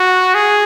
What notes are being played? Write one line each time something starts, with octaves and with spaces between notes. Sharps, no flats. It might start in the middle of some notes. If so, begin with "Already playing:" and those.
Already playing: F#4
G#4